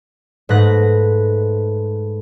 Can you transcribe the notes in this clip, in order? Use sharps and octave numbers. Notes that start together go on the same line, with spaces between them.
G#2 A3 B4 F#6 A#6